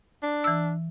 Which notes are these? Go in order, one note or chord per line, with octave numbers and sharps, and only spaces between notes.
D4
E3 E6